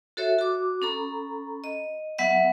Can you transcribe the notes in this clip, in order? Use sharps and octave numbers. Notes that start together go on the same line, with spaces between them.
F#4 A4 C#5 E5
F#4 D6
C#4 A4 A#5 B5
D#5
F#3 B3 E5 F#5